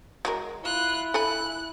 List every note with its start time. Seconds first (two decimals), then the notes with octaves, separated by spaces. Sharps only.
0.25 F#3 G#3 A#4
0.63 E4 F4 F#6
1.14 A4 G#5 B5 F#6